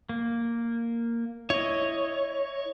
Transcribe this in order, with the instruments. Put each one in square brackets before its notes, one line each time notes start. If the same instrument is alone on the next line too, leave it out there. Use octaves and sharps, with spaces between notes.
[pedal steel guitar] A#3
[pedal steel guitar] E4 D#5 [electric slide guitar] C#5